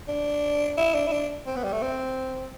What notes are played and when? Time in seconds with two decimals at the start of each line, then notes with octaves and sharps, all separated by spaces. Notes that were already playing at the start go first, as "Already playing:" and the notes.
0.08 D4
0.78 E4
0.95 D4
1.08 E4
1.12 D4
1.47 C4
1.56 B3
1.64 G3
1.72 A3
1.82 C4